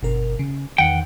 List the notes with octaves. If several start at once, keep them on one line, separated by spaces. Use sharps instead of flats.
G1 B2 A#4
C#3
E2 D#3 F#5 G5